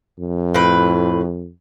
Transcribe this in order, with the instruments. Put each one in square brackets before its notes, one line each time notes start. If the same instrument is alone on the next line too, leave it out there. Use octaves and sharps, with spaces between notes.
[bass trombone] F2
[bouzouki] A2 B4